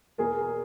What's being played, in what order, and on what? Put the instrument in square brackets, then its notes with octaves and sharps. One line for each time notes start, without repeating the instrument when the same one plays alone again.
[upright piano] E2 B2 G#4 A#4